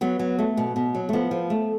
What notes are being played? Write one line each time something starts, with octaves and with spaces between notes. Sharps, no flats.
F#3 B3
F#3
A3
B2
B2
F#3
A3
F3 B3
F3
A3